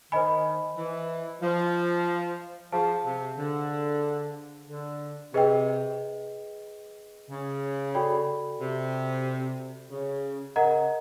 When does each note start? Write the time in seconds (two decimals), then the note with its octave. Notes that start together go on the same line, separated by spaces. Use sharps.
0.12 D#3 C5 D#5 G#5 B5
0.77 E3
1.42 F3
2.72 F3 G#4 C5 F5 A5
3.05 C3
3.37 D3
4.68 D3
5.34 C3 G#4 B4 D#5 G5
7.30 C#3
7.95 F#4 A4 D5 G5 B5
8.60 C3
9.91 C#3
10.56 C#3 A#4 D#5 F#5 A#5